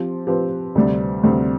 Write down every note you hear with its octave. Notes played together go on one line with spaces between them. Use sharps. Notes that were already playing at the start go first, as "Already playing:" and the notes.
Already playing: F3 C4 G4
F3 C4 G4 B4
D2 C3 G3 C4
D2 C3 G3 C4